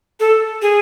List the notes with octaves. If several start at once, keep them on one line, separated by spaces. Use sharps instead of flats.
A4
G#4